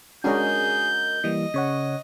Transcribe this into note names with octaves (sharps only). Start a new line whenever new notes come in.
G#3 C#4 D4 F#4 G#4 A#4 D#5 G6
E3 G3 A#3 D#5
C#3 C#5 F#5